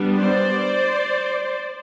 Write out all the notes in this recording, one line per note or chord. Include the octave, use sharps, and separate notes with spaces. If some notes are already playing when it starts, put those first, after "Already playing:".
Already playing: G3 B3 D4
C5 D5